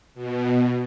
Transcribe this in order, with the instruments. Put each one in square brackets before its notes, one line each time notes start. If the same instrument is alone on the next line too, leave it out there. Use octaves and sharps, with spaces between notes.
[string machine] B2